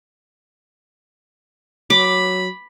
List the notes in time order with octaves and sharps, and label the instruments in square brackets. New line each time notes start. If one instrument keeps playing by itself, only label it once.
[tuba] F#3 [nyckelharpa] B5 [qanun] D6